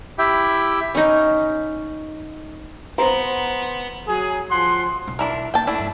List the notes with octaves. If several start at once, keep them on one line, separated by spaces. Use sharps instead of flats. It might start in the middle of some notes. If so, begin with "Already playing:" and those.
E4 G4 E5 G5
C#4 D#4
B3 C5 A#5
F#3 G#4
F3 F#5 C6
B1
D4 E4 A#4
A#3 B3 G5 A5
A3 D4 E4
G2